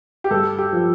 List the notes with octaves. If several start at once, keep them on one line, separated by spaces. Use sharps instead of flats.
G4
G2 A4
G4
F3